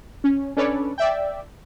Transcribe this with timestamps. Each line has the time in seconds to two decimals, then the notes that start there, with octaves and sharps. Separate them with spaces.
0.24 C#4
0.57 C#4 D4 A4 B4 C#5 D5
0.98 D5 E5 G5